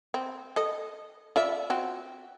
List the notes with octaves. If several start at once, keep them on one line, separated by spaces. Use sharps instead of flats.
C4
A4 D#5
F4 D5 E5
C4 F#4